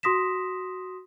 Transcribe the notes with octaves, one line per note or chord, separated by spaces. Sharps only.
F#4 C6 D#6 A#6 B6 E7